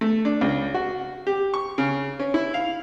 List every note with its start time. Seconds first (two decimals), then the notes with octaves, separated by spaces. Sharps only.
0.01 A3
0.25 D4
0.41 C#2
0.74 F#4
1.27 G4
1.54 C#6
1.78 C#3
2.20 C#4
2.34 E4
2.54 F5